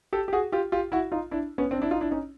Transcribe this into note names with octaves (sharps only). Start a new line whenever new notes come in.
G4 A4
G4
F#4 G#4
F4 G4
F4 G4
E4 F#4
D#4 F4
D4 E4
B3 C#4
C4 D4
D4 E4
D#4 F4
D4 E4
C#4 D#4